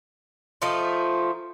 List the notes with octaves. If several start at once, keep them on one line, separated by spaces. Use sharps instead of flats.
F3 A3 D#4 F4